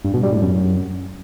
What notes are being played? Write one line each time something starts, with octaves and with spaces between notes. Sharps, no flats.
G2
B2
G3
A2
F#2